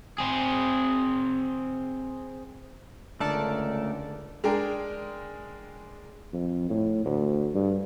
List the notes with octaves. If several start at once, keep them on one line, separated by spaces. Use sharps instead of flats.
C4 G#4
C#2 D3 A3 A4 A#4 D5 A5
G#3 D4 G#4 A#4 G5
F2
A2
D2
G2